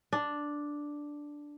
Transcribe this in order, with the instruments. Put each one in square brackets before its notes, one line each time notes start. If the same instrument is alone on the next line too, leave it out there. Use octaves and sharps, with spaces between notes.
[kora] D4